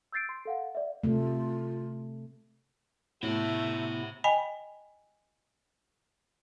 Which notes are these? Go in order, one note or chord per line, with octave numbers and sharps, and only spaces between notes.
E6 G6 A6 C7 D7
C6
A4 F5 F#5
D5 E5
C3 A3 F4
A2 C3 A3 B3 E4 C5 E5
D#5 G5 G#5 B5